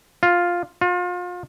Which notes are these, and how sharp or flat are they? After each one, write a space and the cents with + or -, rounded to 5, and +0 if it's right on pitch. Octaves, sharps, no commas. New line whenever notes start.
F4 +5
F4 +35